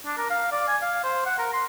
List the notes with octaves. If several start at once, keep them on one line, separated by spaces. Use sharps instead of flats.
D4
A#4
F5
D5
G#5
F5
C5
F#5
A#4
C6